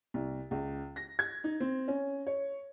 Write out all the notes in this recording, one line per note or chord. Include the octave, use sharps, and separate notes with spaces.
C2
C#2
A#6
G#6
D#4
C4
C#4
C#5